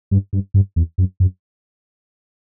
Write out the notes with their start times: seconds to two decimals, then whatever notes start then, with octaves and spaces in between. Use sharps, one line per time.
0.11 G2
0.33 G2
0.54 G2
0.76 E2
0.98 F#2
1.20 F#2